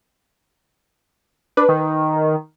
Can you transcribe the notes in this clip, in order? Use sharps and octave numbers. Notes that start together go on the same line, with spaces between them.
D4 B4
D#3